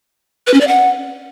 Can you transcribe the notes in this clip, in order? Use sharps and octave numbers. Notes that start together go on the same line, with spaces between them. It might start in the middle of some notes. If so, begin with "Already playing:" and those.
B4
C#4
D5
F#5